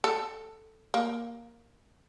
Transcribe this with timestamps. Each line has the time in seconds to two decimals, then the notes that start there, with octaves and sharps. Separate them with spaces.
0.04 A4
0.94 A#3